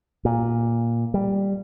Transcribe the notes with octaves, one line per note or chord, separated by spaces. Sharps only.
A#2
G3